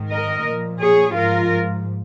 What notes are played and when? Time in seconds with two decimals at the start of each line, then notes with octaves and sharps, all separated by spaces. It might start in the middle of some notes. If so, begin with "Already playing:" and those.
Already playing: G#2 D#3
0.10 A#4 D#5
0.45 A#2 F3
0.81 G#4 C#5
1.16 G#2 F3 F4 A#4